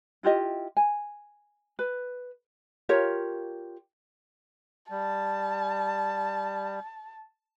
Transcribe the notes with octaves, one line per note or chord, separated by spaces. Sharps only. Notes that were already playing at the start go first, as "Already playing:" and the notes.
E4 F4 G4 D#5
G#5
B4
F4 G4 A#4 C#5
G3 A5